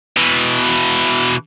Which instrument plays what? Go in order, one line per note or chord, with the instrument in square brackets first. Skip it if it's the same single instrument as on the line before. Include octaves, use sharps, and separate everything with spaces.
[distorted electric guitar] B2 E3